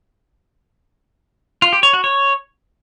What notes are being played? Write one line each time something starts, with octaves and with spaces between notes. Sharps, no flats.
F4
G4
C#5
F#4
C#5